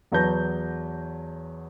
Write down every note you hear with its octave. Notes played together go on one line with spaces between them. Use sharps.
E2 F#3 B4 A5 G6 A#6